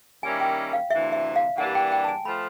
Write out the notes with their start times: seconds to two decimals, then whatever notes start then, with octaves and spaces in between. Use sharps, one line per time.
0.23 D#3 G3 A#3 C#4 E4 G#5
0.40 G5
0.73 F5
0.90 D2 C3 E3 E5
1.13 E5
1.36 F5
1.58 G2 E3 G3 A#3 D4 F#5
1.75 G5
1.92 G5
2.04 A5
2.08 G#5
2.25 F3 A3 B5